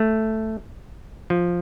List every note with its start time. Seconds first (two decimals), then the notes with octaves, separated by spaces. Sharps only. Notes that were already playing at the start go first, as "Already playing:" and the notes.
Already playing: A3
1.30 F3